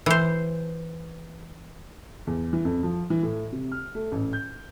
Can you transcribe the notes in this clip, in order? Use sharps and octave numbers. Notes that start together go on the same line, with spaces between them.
E3 C5
E2
E3
F2
F3
E3
A2
C3
F6
A3
A1
G6